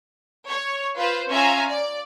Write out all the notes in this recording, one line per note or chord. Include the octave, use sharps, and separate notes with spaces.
C#5
F4 B4 C5
C#4 F4 E5 F5 G#5 A#5
D5